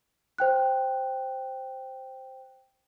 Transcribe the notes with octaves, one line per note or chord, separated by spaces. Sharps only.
C5 G5 F#6